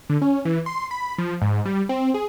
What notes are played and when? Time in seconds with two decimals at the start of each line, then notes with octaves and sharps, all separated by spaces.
0.10 D3
0.22 C#4
0.45 E3
0.66 C6
0.91 B5
1.18 F3
1.42 G#2
1.65 G3
1.89 C4
2.14 G#4